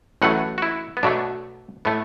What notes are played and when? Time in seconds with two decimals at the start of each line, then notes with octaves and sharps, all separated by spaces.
0.22 A1 A2 F#3 A3 F#5
0.58 F#4
0.62 E4
0.97 B3
1.03 B1 B2 F#3 A3 D4
1.85 A2 A3 B3